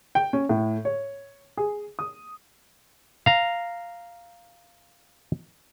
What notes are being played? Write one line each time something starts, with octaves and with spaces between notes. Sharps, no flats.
G5
C#4
A2
C#5
G#4
D#6
F5 A#5